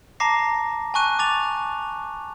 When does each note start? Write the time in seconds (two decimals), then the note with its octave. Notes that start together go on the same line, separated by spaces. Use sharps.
0.20 A5 A#5 D6 A#6 C7
0.94 G#5 A5 C#6 F#6 D#7
1.19 D6 A6 F7